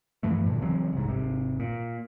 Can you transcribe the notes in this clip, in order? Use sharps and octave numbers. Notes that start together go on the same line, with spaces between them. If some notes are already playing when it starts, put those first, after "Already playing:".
G2 E3 F3 A3
D2 A#2
C#3 E3 F#3 C4
C2 G#2
G#1 C3
A#2